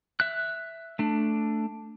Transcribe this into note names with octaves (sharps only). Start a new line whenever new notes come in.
E5 F#6
A3 D4